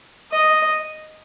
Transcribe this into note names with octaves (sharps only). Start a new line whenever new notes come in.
D#5